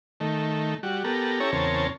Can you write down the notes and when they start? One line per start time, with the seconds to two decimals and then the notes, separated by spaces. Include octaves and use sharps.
0.20 D#3 A3
0.83 G3 F#4
1.04 B3 G4 A4 A#4
1.40 C#4 E4 G4 A4 C#5 A#5
1.52 E2 C#3 C4 A#4 C#5 A5